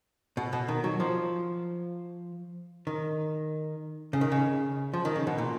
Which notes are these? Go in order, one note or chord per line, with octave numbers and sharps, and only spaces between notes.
B2
B2
D#3
F#3
F3
D#3
C#3
D#3
C#3
F3
D#3
C#3
B2
A#2